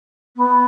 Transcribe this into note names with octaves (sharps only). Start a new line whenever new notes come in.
B3